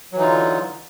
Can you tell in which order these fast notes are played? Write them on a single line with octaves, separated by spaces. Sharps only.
F#3 E3 D#4 F4 D3